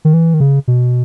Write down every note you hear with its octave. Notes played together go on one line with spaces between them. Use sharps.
D#3
E3
D#3
C#3
B2